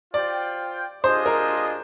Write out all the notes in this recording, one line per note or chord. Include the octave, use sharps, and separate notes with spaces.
F4 C5 D5 G5
D4 F4 G#4 C5 D#5
A#4